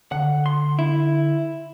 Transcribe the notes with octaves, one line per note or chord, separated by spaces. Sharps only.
D3 F#5
C6
E4